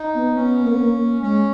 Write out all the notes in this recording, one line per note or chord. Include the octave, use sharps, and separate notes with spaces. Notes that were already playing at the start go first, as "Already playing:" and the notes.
Already playing: D#4
B3
B3 C#4
A#3
B3
A#3
A#3
G#3 C#4